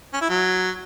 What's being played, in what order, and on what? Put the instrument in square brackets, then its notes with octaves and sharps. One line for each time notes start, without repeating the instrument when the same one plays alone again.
[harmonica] C#4
E4
F#3